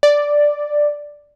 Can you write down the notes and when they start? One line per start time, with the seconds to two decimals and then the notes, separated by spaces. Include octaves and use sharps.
0.03 D5